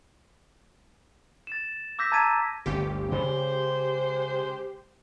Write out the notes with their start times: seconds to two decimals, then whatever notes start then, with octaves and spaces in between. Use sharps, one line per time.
1.47 A6 E7
1.99 D6 E6 G6 A#6 B6
2.12 A5 A#5 G#6 A6 B6 D#7
2.66 G1 D2 C#4 G4
3.12 C#3 G#3 C5